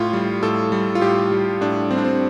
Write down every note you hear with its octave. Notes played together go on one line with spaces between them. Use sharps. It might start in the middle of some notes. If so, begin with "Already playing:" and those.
Already playing: A2 F4
G3
A2 A4
G3
F4
A2 G4
G3
A2 D4
G3 C4
D4
C4